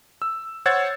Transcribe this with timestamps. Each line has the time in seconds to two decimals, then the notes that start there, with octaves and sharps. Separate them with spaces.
0.22 E6
0.66 C5 C#5 F#5 E6 G#6 A6